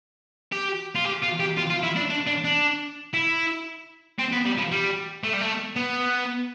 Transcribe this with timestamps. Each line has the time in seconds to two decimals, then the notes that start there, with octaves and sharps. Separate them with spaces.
0.52 G4
0.95 F4
1.05 G4
1.22 F4
1.40 G4
1.57 F4
1.70 F4
1.83 E4
1.96 D4
2.10 D4
2.27 D4
2.44 D4
3.14 E4
4.19 C4
4.32 B3
4.45 G3
4.57 F3
4.72 G3
5.24 A3
5.33 G3
5.41 A3
5.76 B3